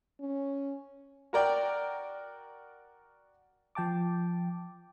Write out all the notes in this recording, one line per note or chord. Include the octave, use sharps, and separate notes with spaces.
C#4
F#4 A#4 D5 G5
F3 G5 A5 D6